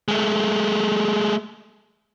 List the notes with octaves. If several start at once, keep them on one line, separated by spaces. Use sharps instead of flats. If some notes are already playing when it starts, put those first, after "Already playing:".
G#3 A3